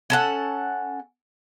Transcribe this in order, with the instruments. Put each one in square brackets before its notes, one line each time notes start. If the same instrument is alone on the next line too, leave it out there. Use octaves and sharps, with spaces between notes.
[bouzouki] C#4 A4 F#5